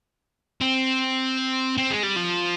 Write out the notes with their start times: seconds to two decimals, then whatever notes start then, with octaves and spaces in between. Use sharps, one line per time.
0.61 C4
1.78 C4
1.90 G#3
2.03 G3
2.16 F3